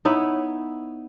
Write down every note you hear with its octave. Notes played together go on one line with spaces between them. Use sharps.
B3 D#4 E4 C#5